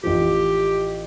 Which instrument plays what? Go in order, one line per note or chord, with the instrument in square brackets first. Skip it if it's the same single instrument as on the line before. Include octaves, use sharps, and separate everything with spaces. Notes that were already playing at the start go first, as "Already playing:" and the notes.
[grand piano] A1 F3 [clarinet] G4